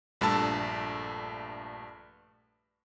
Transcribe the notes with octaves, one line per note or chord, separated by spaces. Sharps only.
A#1 G2 A3 A5 E6